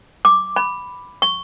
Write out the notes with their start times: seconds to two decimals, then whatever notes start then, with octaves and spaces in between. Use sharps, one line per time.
0.25 D6
0.56 B5
1.22 C#6